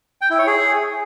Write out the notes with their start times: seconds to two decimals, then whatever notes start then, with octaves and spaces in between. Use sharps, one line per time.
0.21 G5
0.30 E4
0.38 C#5
0.47 G#4